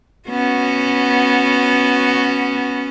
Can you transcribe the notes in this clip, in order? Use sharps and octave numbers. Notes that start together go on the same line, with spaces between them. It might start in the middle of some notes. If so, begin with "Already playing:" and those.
B3 C#4 F#4